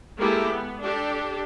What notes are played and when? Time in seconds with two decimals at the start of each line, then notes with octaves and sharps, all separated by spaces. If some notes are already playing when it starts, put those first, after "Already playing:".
0.18 G#3 A#3 E4 G4 A4
0.50 B3
0.81 D4 G4 A4